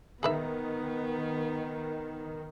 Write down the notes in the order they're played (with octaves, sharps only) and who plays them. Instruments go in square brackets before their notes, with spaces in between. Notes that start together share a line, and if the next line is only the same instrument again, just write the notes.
[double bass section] D#3 [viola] B3 [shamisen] G#4 B4 E5